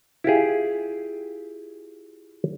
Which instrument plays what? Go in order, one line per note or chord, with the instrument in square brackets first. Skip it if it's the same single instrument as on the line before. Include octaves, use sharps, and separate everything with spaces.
[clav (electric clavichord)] E4 F4 G4 G#4